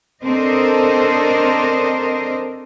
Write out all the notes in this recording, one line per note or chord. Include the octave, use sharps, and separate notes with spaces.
C4 D4 A4 A#4 C5 D#5